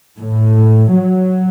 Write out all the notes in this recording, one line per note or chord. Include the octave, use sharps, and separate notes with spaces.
A2
F#3